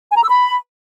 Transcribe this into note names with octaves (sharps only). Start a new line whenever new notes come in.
G#5
A#5
E6
B5